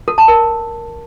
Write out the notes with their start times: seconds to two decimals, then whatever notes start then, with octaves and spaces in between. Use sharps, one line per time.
0.08 A4
0.18 A5
0.28 A#4